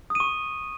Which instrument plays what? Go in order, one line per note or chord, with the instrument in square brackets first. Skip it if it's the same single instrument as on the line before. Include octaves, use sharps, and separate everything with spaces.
[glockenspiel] D#6
D#7
C#6